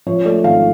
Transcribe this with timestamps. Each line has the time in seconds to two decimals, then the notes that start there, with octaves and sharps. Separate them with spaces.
0.06 F3 C#5
0.25 A3 D5
0.44 G#1 F5